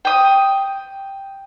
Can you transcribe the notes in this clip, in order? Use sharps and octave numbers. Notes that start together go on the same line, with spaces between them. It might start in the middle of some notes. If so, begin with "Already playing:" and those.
G5 D#6